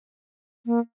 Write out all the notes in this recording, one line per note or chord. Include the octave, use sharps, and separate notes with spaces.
A#3